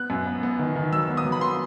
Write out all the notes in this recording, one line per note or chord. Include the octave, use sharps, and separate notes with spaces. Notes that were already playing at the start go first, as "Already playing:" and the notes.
Already playing: B3 F#6
F#2
B3
B3
D#3
D#3
F#3 E6
B3
D#6
F#3
B5
B3 C6